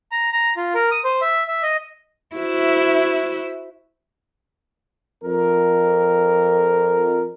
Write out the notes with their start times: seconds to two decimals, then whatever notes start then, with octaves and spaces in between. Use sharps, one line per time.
0.12 A#5
0.32 A#5
0.57 F4
0.74 A#4
0.91 D#6
1.04 C5
1.21 E5
1.48 E5
1.63 D#5
2.35 E4 F#4 C5 E5
5.24 F2 A#4